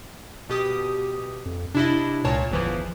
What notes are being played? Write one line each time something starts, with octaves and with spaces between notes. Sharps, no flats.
B2 G4 D#6
F2
C3 D4 E4 D#5
C#2 A#2 C#5 A5
G1 E2 E3 F3